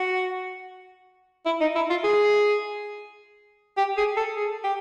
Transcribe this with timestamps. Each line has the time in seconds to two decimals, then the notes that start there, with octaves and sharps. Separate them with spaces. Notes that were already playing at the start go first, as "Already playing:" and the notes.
Already playing: F#4
1.46 E4
1.61 D#4
1.76 E4
1.90 F4
2.04 G#4
3.77 G4
3.98 G#4
4.17 A4
4.36 G#4
4.64 G4